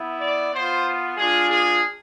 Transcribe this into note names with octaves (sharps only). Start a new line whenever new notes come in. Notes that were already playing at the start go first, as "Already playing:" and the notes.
Already playing: B3 E4
D5
B3 F4 C5
G#3 D4 F4 G#4
G#4